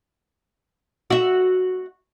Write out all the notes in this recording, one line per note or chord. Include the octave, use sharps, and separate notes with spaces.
F#4 E5